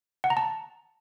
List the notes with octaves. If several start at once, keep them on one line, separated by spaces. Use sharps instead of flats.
F#5
A#5
A5